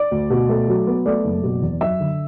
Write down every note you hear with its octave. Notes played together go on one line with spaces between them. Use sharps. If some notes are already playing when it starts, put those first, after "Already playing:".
Already playing: D5
D2
B2
A3
F#3
B3
A3 D5
F#1
B2
E2
F#2 E5
D3